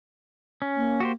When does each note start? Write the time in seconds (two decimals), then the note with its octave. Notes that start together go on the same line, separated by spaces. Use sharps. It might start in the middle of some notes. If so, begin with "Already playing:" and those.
0.62 C#4
0.76 A#3
1.00 F#4 G4 C5